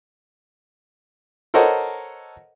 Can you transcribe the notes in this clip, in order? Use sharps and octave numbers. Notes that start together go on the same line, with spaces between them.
A4 A#4 C5 C#5 D#5 F#5